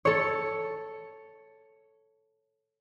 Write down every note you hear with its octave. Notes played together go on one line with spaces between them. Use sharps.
A4 C#5